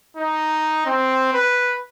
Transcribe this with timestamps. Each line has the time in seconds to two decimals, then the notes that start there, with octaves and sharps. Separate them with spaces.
0.17 D#4
0.86 C4
1.34 B4